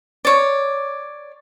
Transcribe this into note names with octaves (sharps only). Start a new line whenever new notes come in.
C#5 D5